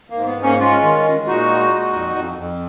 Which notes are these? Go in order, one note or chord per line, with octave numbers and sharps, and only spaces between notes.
G#2 A#3
B3
G#2
A#3 C#4
G#3 C#4 F4
D#3
G#3
A#2 D#4 F#4
G#3
A#2
F2
F2
F2